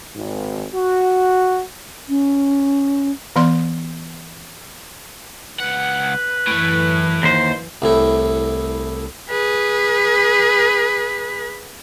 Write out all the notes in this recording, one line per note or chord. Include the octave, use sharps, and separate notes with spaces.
G#1
F#4
C#4
E3 B3 D5 C6
C#2 B4 F#5
F#2 A2 E3 A3
D#2 C5
C2 A2 E4
G#4 B4